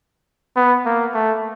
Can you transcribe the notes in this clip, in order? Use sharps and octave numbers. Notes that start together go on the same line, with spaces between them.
B3
A#3
A3